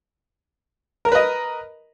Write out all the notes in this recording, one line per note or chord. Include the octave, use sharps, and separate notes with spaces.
A#4 B4 D#5 A#5